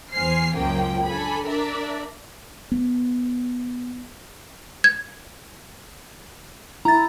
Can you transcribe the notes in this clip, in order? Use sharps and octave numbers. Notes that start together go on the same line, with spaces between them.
E2 C5 G#5 F6 C7
C#2 F#2 F3 A#3 C#4 G5
D4 A4 G#5 B5
D4 A#4 D5 E5
B3
G#6
E4 A#5 A6